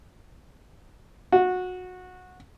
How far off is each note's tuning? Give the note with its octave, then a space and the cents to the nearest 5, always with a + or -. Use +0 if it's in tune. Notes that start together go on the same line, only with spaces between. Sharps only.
F#4 -20